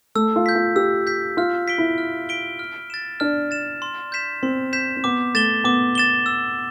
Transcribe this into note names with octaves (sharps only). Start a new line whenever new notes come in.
A3 E6
F4
G6 B6
F4
G4 E6
G6 B6
F4 F6
B6 D7 G7
E4
F6
B6 D7 G7
F6
A6 E7
D4 F6
A6 E7
C6
G6 B6 E7
C4 C6
G6 B6 E7
C4
B3 D6
A3 A6 E7 G7
B3 D6
A6 E7 G7
E6